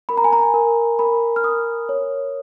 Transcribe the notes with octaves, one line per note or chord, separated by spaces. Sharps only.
A#4 B5
A#5
G#5
A#5
A#4
A#4 B5
F6
A#4 D#6
C#5